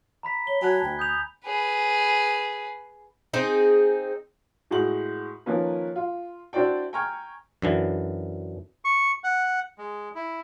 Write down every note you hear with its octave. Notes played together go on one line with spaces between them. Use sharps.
A#5 B5 B6
C#5 G7
F#3 G#5 A5 F#6 G#6
D2 G5
D#6 G6 F7
G#4 B4
C4 D#4 G#4
A2 G#3 F#4 F#5 F#7
D#3 F3 A#3 C#4 B4
F4
D4 E4 F#4 C5 D5 G5
G5 G#5 A#5 C#6 F6 G#6
F#2 D3 E3
C#6
F#5
G#3
E4